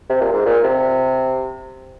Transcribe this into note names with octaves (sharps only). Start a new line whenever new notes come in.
C3
A#2
G#2
A#2
C3